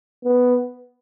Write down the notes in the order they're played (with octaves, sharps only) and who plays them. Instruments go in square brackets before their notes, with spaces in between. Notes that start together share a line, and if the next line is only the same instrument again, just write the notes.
[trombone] B3